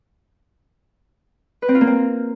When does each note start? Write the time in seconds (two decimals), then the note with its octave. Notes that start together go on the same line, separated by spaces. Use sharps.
1.62 B4
1.68 C4
1.75 F4
1.81 A#3
1.87 C4